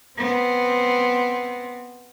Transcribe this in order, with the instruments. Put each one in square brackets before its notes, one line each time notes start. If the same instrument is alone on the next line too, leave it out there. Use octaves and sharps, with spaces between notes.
[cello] B3 C4